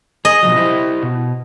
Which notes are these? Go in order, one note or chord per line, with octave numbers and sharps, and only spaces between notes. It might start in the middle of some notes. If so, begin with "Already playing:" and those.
G#4 D#5
B2 F3 F#3
E4 G4 C5
B2